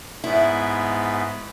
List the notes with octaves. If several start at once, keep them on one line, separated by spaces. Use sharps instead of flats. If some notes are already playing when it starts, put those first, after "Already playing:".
G#2 B3 E4